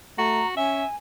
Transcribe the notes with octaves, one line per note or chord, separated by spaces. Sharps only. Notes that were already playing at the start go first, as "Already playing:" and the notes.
A3 F#4 A#5
C#4 E5 G#5